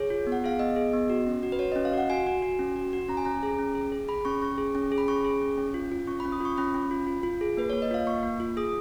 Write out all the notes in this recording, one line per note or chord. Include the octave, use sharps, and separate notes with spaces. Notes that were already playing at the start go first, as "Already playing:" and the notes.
Already playing: G#4 C#5
F4
B3
F#5
G#4 F5
B3 D#5
G#4
B3
F#4
C#4
F#4
B4
F#4 C#5
D#5
C#4
F5
F#4 F#5
F#4 G#5
F#4
F#4
C#4
F#4
F#4
C#4 A#5
G#5
C#4 A#5
G#4
C#4
G#4
G#4
G#4 B5
C#4 C#6
C#4 C#6
G#4
C#4
G#4
B5
C#4 C#6
G#4
C#4
C#4
F4
F4
C#4 C#6
B5
C#4
D#6
F4 C#6
C#4 B5
C#4
F4
F4
F4
G#4
A#3 B4
A#3 C#5
D#5
F4 F5
A#3 C#6
A#3
F4
G#4 D#6